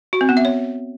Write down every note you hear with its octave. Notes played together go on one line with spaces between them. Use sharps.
F#4
C4
B3
E5
C#5